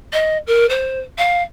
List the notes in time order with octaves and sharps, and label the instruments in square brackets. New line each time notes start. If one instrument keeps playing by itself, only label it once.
[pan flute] D#5
A#4
C5
F5